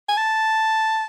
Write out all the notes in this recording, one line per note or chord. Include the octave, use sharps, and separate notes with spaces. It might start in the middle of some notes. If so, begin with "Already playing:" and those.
G#5
A5